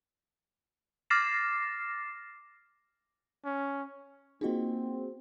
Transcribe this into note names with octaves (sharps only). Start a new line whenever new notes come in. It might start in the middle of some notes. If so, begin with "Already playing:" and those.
D6 F6 A6 A#6 C7 E7
C#4
A#3 C4 D#4 F4 F#4 G#4 D#5